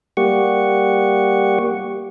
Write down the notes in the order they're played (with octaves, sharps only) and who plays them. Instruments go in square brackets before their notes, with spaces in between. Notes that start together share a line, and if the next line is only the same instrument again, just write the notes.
[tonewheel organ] G3 A#3 G4 F#5 C#6